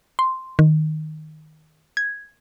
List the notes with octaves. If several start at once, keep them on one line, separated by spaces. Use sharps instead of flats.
C6
D#3
G#6